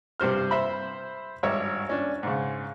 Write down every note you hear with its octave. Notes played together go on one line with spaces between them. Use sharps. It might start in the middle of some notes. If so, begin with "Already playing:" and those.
G2 C3 C5 F6
C5 E5 B5
G#1 G2 C#5 E5
C#4 D4
G#2 C#3